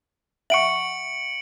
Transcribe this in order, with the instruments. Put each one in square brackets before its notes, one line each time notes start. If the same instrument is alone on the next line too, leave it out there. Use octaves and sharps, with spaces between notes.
[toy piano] E5 F#5 C#6 [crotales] C#7 D7 F#7